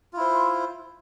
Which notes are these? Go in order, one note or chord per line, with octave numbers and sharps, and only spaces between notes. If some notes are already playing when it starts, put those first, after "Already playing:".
E4 F4 C5